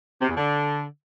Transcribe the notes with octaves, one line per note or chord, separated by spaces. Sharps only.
C3
E2
D3